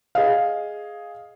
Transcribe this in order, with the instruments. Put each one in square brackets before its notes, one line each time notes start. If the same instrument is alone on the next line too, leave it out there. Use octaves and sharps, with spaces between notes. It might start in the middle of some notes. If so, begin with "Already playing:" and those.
[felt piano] G#4 D#5 F5